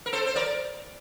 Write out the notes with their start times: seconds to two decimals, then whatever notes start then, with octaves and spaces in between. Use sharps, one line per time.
0.06 A#4
0.13 A4 C5
0.26 C5
0.36 A#4 D5